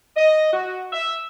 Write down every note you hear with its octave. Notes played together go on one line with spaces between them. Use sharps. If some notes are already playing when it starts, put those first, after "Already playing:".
D#5
F#4
E5